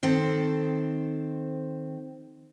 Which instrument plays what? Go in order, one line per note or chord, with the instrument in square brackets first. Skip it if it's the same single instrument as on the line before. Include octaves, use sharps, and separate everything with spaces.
[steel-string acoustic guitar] D#3 C4 A4 C5